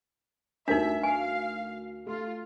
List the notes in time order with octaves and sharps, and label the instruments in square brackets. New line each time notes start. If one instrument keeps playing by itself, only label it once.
[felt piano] D2 A#4 B6 [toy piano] D4 D#4 [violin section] E5
[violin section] F5 [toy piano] G#5
[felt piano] A3 [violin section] F4